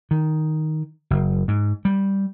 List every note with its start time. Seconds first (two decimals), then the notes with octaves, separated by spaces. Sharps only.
0.11 D#3
1.10 F#1
1.48 G#2
1.85 G3